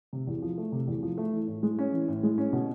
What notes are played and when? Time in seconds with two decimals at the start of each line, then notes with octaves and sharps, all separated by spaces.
0.13 C3
0.27 E2
0.42 F3
0.58 A3
0.72 C3
0.87 E2
1.03 F3
1.18 A3
1.33 E3
1.48 A2
1.63 G#3
1.79 C#4
1.93 E3
2.08 A2
2.23 G#3
2.38 C#4
2.53 B2